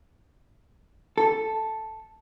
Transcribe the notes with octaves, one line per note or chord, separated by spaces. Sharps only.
A4